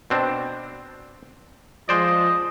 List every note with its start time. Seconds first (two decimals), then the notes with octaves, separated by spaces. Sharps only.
0.10 B2 C4 D4
1.89 F3 G#3 C5 D5 D#5